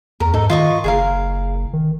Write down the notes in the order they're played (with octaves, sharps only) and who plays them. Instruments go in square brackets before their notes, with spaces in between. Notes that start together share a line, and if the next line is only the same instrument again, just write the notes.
[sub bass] E2 [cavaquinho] A#4
[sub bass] G#2 [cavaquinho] D#4 A4
[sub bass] D#3 [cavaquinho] F4 D#5 C#6
[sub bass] F#1 [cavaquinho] G#4 A#4 F5
[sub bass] D#3